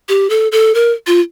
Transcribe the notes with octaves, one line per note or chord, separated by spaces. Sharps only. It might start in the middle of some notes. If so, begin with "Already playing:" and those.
G4
A4
A4
A#4
F4